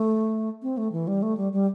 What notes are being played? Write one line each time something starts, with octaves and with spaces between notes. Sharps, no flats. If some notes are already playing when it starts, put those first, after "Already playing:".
Already playing: A3
C4
A3
E3
G3
A3
G3
G3